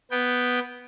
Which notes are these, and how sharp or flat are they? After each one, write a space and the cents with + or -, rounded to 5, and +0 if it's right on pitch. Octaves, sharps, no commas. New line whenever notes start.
B3 +0 G5 +0